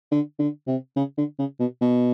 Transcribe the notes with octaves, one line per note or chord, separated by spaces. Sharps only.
D3
D3
C3
C#3
D3
C#3
B2
B2